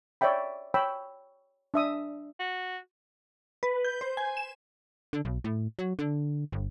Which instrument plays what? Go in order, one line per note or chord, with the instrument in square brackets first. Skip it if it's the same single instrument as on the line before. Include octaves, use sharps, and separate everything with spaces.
[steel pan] C#5 D5 E5 G5 B5
C#5 G5 B5 E6
D4 E5 D#6
[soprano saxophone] F#4
[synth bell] B4
G6
C5
G#5
E7
[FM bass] D3
B1
A2
F#3
D3
G1